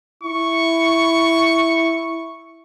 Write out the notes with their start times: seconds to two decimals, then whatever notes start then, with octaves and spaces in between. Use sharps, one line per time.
0.23 E4 C#6